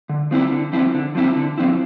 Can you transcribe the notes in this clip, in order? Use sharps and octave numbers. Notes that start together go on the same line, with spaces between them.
D3
F3 C4 E4
D3
F3 C4 E4
D3
F3 C4 E4
D3
F3 C4 E4